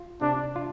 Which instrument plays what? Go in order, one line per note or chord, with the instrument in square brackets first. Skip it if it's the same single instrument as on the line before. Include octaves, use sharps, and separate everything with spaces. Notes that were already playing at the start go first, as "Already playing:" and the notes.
Already playing: [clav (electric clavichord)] F4
[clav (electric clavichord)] C3 [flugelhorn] D4
[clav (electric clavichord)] F4